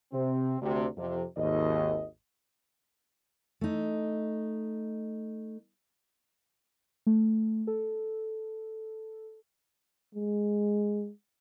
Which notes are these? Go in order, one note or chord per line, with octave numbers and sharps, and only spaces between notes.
C3 C4
D2 C3
F2 C3
G#1 D#2 D#5
A3 D#4
A3
A4
G#3